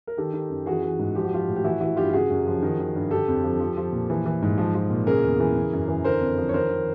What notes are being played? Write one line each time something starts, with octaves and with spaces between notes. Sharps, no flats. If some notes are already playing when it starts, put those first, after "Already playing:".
A#4
D#3 G4 A4
D#3
F#2
E3 F#4 G#4
E3
G#2
F3 G4
F#4
F3 F4 G4
A2
G4
E3 E4 F#4
E3 E4 F#4
G2 F4 G4
G4
C#3 F#4 G#4
F#2
F3
D#3
D#3
G2
D3 G4 A4
F2
F3
F3
F3
A#2
E3
E3
G#2
F3
F3
A#2
C#3 G#4 A#4
E2
E3
C#3
F#2
E3
D3 A#4 C5
F2
F3
C#5
D#3 A#4 C5
D#3